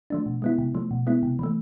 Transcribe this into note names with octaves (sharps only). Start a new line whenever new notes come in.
F3 A3 D4
B2
G#3 B3 E4
C3
F3 A3
B2
G#3 B3 E4
C3
E3 A3